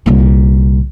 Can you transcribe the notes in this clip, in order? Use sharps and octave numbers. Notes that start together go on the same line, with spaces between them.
C2 A#2